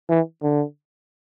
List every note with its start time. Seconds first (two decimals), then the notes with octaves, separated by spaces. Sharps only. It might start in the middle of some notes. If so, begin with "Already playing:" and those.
0.09 E3
0.42 D3